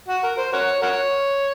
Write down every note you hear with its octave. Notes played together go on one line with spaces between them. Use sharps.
F#4
A#4
C5
F#4 A#4 C#5
F#4 A#4 C#5